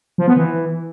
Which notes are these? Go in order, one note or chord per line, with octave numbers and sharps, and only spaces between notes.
F3
B3
E3